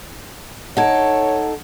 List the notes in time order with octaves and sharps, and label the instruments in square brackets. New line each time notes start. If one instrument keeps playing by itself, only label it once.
[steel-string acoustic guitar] D#4 A4 [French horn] C#5 [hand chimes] F#5 G#6 D7